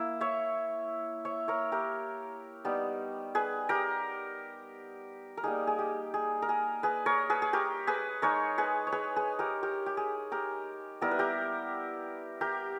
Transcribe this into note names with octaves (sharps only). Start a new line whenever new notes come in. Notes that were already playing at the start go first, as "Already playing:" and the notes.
Already playing: A#3 E4
C#5 E5
C#5 E5
A#4 C#5
G4 A#4
G3 B3 D#4
G#4 B4
G4 A#4
A#4
G3 A#3 D#4 G#4
G#4
G4
G#4
A#4
G#4
G#4 B4
A#4 C#5
G#4 B4
G#4
G4 A#4
G#4 B4
G#3 D#4 A#4 C#5
G#4 B4
C#5
G#4 B4
G#4 B4
G4 A#4
G4 A#4
G4
G#4
G4 A#4
G3 B3 E4 A#4
B4
G4 A#4
G4 A#4